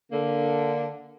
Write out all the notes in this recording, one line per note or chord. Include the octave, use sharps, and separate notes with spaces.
D3 A#3